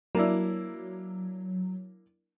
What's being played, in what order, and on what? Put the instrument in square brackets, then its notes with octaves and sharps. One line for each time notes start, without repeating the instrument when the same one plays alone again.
[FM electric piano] F#3 [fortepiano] A#3 D4 E4